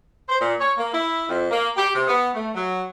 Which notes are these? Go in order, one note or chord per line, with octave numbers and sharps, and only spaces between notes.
C5
A#2
C#5
A#3
E4
F2
A#3
G4
C3
B3
A3
F#3